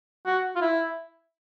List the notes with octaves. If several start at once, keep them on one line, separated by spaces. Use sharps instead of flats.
F#4
F4
E4